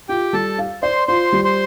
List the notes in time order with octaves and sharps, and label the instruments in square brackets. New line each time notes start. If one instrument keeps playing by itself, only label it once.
[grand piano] F4 [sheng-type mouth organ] G4 G5
[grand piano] G3 [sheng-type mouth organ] A4 A5
[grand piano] F5
[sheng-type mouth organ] C5 C6 [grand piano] D5
[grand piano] F4 [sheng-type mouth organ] C5 C6
[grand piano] G3
[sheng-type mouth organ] C5 C6